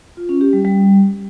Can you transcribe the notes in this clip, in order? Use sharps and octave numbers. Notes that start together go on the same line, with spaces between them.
F4
C#4
G4
G3
G3